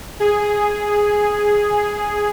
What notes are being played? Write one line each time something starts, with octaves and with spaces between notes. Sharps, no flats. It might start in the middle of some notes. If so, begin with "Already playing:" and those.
G#4